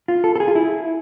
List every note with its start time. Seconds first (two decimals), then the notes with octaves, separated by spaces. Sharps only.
0.08 F4
0.24 A4
0.36 A4
0.40 G#4
0.48 F4
0.55 E4